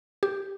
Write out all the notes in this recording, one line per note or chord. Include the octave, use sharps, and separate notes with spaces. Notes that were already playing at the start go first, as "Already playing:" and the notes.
G4